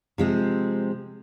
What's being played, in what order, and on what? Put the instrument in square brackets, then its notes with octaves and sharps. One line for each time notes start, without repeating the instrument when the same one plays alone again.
[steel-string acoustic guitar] C3 F3 G#3 C4